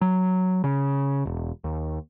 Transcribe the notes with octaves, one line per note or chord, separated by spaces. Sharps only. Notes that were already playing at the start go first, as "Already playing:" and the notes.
F#3
C#3
E1
D#2